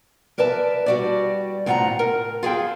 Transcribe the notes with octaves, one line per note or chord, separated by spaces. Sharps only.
A#4 B4 D5 E5 A5
G3 F#4 D5
A2 C4 F4 F#5 G5 A#5
A#4
F4 G#4 A4 G5